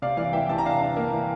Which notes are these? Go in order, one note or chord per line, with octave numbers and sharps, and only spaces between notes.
C3 D5 F5
E3 D5 F5
E3 E5 G5
C3 A5
A#5
D4 F5 A5
D4
A#3
E3